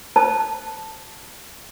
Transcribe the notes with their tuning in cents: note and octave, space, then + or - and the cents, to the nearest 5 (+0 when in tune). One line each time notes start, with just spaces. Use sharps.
C5 -5 A5 +0